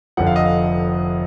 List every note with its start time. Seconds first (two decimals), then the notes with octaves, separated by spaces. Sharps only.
0.17 F1 F2 D3 F3 F#5
0.27 F5
0.36 D#5
0.45 F5